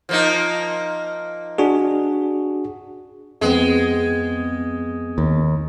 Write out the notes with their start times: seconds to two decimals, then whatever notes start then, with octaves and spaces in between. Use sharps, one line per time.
0.09 F3 A#3 D#4
1.58 D4 F#4 G#4
3.41 F2 G#3 B3 C4
5.18 D#2